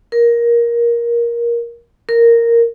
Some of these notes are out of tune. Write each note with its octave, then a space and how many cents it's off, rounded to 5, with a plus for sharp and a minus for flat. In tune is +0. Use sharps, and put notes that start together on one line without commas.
A#4 +15
A#4 -5